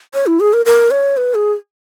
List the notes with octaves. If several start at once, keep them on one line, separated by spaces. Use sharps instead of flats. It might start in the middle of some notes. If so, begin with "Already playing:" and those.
C#5
E4
G#4
A#4
A#4
C#5
B4
G#4